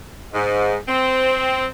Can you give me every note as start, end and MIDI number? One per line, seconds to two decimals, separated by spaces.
0.34 0.77 44
0.88 1.66 60